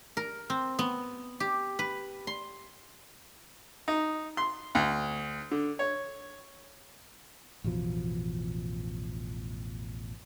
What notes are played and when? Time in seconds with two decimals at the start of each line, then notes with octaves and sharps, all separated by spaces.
0.17 A#4
0.50 C4
0.79 B3
1.40 G4
1.79 B4
2.27 C6
3.88 D#4
4.37 C6
4.75 D2
5.51 D3
5.79 C#5
7.64 A1 E2 B2 F3